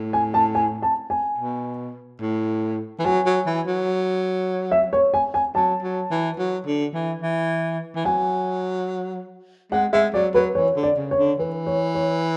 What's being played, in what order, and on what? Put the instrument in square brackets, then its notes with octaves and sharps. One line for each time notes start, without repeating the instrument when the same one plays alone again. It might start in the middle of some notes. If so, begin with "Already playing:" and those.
Already playing: [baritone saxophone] A2
[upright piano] G#5
A5
G#5
A5
G#5
[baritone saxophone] B2
A2
E3
[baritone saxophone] F#3 [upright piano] G#5
[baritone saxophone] F#3
E3
F#3
[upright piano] E5
C#5
G#5
G#5
[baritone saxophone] F#3 [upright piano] A5
[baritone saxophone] F#3
E3
F#3
D3
E3
E3
E3
[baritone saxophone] F#3 [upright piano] G#5
[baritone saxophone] G#3 [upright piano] F#5
[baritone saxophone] G#3 [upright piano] E5
[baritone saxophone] F#3 [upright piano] D5
[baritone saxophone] F#3 [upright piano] B4
[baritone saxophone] E3 [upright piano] C#5
[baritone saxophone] D3
[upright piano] D5
[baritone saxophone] C#3
[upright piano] C#5
[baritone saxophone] D3
[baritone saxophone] E3 [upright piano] B4
[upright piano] C#5
C#5